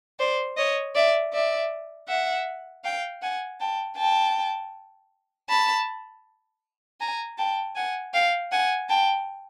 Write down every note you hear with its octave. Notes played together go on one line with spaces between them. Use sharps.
C5 D5
C#5 D#5
D5 E5
D5 E5
E5 F#5
F5 G5
F#5 G#5
G5 A5
G5 A5
A5 B5
G#5 A#5
G5 A5
F#5 G#5
F5 G5
F#5 G#5
G5 A5